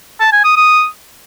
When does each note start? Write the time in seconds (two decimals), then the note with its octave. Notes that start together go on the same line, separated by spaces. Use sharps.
0.21 A5
0.32 G#5
0.44 D#6
0.56 D#6